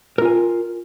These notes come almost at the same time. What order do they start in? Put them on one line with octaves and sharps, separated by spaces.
A#4 F4 G#5